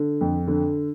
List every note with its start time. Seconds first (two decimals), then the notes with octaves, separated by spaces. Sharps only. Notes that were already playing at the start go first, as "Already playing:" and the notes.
Already playing: D3
0.21 F2
0.48 D3